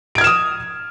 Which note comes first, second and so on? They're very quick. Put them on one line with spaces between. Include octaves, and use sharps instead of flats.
D7 G#6 F6 E7 D#6